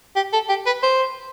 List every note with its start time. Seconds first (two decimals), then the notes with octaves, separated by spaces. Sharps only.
0.16 G4
0.33 A4
0.49 G4
0.66 B4
0.83 C5